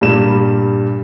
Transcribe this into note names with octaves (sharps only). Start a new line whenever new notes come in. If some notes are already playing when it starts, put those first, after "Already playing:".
G2 A#2 G3 E7